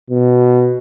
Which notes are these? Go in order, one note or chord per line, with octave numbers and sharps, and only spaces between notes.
B2